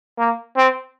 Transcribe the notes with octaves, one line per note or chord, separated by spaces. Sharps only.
A#3
C4